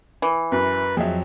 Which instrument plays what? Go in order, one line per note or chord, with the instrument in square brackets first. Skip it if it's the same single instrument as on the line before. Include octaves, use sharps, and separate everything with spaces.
[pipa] E3
[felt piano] F#2 [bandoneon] B4
[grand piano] F2 F#3 [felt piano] G#4 D#5 E5